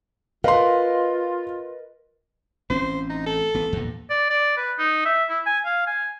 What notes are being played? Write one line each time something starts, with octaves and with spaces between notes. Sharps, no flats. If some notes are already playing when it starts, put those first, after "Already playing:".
F4 A#4 B4 D#5 F5 C6
A1 C4 C#4 C5
D#4
A4
A1 B3
E2 G2 A#2
D5
D5
B4
D#4
E5
E4
G#5
F5
G#5